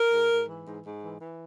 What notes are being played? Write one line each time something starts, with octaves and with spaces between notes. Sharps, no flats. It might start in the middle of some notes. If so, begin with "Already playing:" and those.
Already playing: A#4
G#2
G#2
E3
G#2
G#2
E3
E3